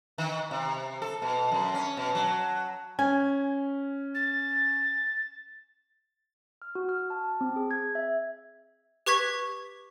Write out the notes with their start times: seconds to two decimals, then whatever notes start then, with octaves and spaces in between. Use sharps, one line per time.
0.18 D#3
0.51 C3
1.02 A4
1.22 B2
1.52 F#2
1.74 C#4
1.97 B2
2.15 F#3
2.99 C#4 G#5
4.14 A6
6.62 F6
6.75 F#4
6.89 F6
7.10 A5
7.41 C4
7.56 G#4
7.71 G#6
7.95 E5
9.06 G4 B4 C#6 G#6 B6